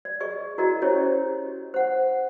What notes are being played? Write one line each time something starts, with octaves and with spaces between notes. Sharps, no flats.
D5
G#4 D5 D#5 C#6
E4 F#4 A#4 D5 D#5
C#4 E4 G4 C5 C#5 D#5
C5 F#5